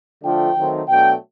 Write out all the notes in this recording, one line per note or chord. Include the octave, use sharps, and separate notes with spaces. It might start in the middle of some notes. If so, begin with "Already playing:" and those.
D3 F3 A3 D4 F4 G5
D#3 F#3 A3 C4 D#4
B2 F#3 A3 D4 G5